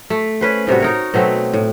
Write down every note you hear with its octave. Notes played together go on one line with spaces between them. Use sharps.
A3
C#4 B4 C5
A2 C3 G3 F#4
D#4 A#4 C#5
B2 F#3 A3 C4
A2